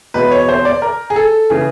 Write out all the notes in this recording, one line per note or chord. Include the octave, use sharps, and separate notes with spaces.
E2 B2 G#3 B4
C#5
C5
D5
A#4
G#4
A4
C#3 E3 G#4